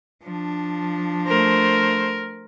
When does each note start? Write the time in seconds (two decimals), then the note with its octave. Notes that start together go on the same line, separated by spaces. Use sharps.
0.23 F3 D4
1.27 A3 A#4 C5